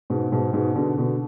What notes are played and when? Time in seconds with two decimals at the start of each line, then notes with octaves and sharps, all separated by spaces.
0.10 G#2 B2
0.32 G#2 B2
0.53 G#2 B2
0.76 B2 D3
0.98 B2 D3